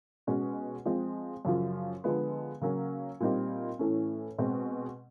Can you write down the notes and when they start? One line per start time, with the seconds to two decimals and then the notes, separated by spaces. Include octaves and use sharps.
0.27 B2 G#3 C#4 F#4
0.86 F3 G#3 C4
1.45 F#2 C#3 F3
2.04 D3 F3 G#3 B3
2.61 C#3 F#3 A#3 C#4
3.20 A#2 G3 C4 D#4 G4
3.79 A2 E3 A3 C#4
4.38 B2 G#3 C4